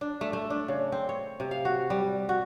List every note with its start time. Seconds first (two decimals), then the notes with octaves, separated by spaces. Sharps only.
0.01 D4
0.21 A3
0.33 A3
0.50 D4
0.68 C#3
0.92 C4
1.09 C#5
1.40 C3
1.51 F5
1.65 F#4
1.90 G3
2.29 F#4